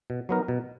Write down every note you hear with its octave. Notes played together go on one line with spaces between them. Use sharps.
B2
F#3 B3 D#4 A#4
B2